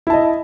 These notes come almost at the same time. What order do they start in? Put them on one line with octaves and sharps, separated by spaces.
E4 A5 D#5